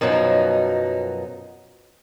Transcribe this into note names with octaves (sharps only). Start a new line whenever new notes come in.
F#2 B2 F3 F#3 D#4